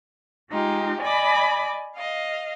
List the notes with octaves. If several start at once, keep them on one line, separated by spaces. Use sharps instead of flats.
G#3 D#4 F4 G4
D5 D#5 G#5 B5 D6
D#5 F5